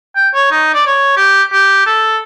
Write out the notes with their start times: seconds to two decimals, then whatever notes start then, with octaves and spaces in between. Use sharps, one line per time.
0.16 G5
0.34 C#5
0.51 D#4
0.74 D5
0.87 C#5
1.17 G4
1.53 G4
1.86 A4